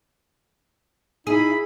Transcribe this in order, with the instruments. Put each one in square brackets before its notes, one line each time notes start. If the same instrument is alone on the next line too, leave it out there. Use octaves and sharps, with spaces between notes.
[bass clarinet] D#4 [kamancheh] E4 B5 [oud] G#4